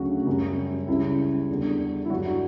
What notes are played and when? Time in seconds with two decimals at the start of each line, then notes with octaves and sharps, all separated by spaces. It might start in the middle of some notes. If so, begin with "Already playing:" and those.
Already playing: D2 C#3 F#3 F#4
0.27 F#2 C#3 G3
0.87 C#2 C#3 G3 E4
1.49 E2 D3 G3
2.05 E4
2.10 G2 D3 F#3 F#4
2.26 F#4